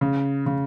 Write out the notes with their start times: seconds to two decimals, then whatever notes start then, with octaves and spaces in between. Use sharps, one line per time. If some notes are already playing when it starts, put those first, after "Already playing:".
0.01 C#3
0.46 C#3